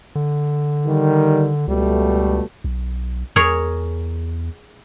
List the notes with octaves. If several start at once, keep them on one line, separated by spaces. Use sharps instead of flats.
D3
D#3 G3
C#2 B2 G3 A3
B1
E2 G#4 A#4 C#5